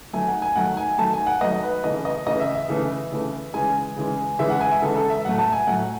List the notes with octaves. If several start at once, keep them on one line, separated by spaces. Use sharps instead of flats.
D#3 F#3 A3 G#5
F#5
G#5
D#3 F#3 A3 F#5
G#5
D#3 F#3 A3 A5
G#5
F#5
D#3 F#3 A3 D#5
B4
C#3 E3 A3 D#5
D#5
C#3 E3 A3 D#5
E5
E5
C#3 E3 A3
C#3 E3 A3
C#3 E3 G#3 G#5
C#3 E3 G#3
C#3 E3 G#3 E5
F#5
G#5
E5
C#3 E3 G#3 A4
A4
E5
A2 F#3 A3 F#5
A5
G#5
A2 F#3 A3 F#5